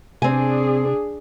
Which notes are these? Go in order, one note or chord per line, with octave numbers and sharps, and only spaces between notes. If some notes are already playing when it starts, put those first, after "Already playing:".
C3 C4 D4 G#4 G#5